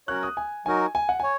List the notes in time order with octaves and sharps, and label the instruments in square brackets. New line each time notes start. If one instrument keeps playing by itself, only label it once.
[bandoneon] F#3 C#4 F#4 A#4 C#5 [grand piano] F#6
[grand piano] D#6
G#5
[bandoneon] F#3 D#4 F#4 A#4 [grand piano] G#5
[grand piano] G#5
F#5
[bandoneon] C#5 [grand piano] G#5